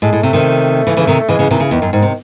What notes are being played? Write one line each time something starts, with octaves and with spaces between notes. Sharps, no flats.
A2 G#3
A2
C3 A3
C3 D#3
C#3 E3
C#3 E3
C3 D#3
C#3 E3 G#3
C#3 E3
C3 D#3 E3
C#3
E2 D#3
F#2
G#2 D#3
C3